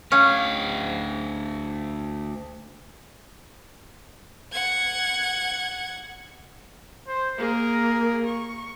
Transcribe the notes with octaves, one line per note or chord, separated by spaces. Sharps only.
D2 C#4 F5
F#5 G#6
C5
A#3 G#4 A#4
C#6